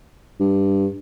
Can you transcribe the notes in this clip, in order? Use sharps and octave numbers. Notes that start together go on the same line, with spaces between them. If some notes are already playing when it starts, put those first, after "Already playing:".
G2